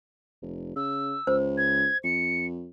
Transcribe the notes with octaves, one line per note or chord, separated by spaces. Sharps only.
F1
C#3 E6
C#2 C5
G#6
F2 C#7